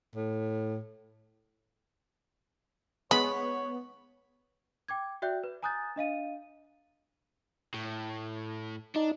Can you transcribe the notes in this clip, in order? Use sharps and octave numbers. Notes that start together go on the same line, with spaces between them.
A2
G#3 B3 C#5 B5
G5 D6 G#6
F#4 D5 E5 G5 F#6 G6
B4
G#5 A#5 D#6 F#6 G6 A6
D4 D#5 F5 D#7
A2
D4 D#4